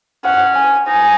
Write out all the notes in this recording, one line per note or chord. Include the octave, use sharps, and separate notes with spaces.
C#4 F#5
G#5
D#4 G#5